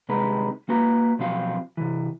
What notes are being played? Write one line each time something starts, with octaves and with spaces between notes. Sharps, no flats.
C2 C3 G#3 D#4 B4 A#5
A#3 F#4 B4 A#5
B2 F3 F#3 C4 F5
C3 E3